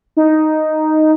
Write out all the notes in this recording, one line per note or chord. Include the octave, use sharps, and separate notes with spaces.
D#4